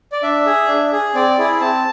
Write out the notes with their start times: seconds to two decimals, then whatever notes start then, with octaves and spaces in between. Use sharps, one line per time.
0.12 D5
0.23 D4 E5
0.46 G#4
0.68 D4
0.92 G#4
1.14 C4 D5
1.38 E4 G#4
1.60 C4 A5